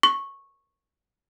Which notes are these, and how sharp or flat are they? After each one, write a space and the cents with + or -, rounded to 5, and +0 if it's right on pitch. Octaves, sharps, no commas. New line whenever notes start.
C#6 -10